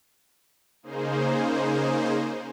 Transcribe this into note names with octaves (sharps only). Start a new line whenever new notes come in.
C#3 A#3 D#4 G#4 C5